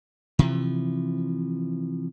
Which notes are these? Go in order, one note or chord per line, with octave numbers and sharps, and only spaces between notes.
C3 E3 F3